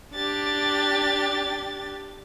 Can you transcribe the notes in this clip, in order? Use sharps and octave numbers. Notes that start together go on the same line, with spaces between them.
D4 G4 A6